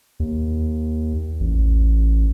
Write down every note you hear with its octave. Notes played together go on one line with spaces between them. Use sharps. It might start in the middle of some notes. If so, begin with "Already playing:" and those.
D#2
A1